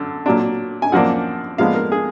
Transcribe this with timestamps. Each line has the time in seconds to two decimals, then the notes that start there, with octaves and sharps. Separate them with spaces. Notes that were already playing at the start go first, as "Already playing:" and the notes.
Already playing: F#2 D3
0.26 A#2 F#3 D4
0.82 G#5
0.92 F#2 F3 A#3 D4 F#5
1.58 A#2 F3 G#3 B3 D4 F5
1.75 A#4
1.92 G#4